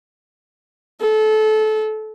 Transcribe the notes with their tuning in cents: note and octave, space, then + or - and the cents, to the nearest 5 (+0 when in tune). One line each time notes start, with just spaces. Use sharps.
A4 -25